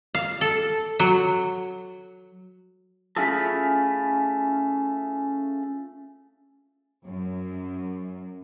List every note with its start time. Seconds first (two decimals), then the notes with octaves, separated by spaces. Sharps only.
0.15 F5
0.41 A4
0.99 F#3
3.16 A3 C#4 E4 F4 G#4 A4
7.05 F#2